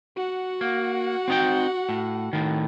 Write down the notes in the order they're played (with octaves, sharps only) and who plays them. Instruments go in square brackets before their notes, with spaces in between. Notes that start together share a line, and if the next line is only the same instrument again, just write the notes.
[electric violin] F#4 F#5
[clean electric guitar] A#3
C4 D#4 G5
A2
A2 D#3